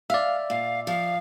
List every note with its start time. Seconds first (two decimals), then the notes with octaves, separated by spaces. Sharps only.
0.10 D5 E5 F5
0.50 A#2 F5
0.87 F3 F5